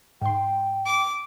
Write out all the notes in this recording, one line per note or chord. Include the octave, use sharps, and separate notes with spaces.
G#2 G5 C6
D6